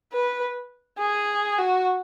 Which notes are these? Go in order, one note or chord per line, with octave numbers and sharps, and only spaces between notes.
B4
G#4
F#4